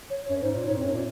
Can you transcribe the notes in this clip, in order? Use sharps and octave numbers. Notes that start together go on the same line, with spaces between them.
C#5
F#2 C#5
G#2 C5
A#2
G#2 C#5
F2
F#2 C#5
A#2